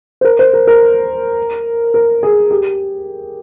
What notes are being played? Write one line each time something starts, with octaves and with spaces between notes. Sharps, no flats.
C5
A#4
C5
A#4
A#4
A#4
G#4
G4